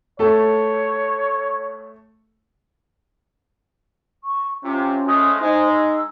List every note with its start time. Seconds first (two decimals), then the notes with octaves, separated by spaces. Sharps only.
0.19 A3 A4 C#5
4.24 C#6
4.64 C3 C#4 F4
5.07 F3 G#3 A3 D#6
5.41 G#3 D#4 C5
5.73 E6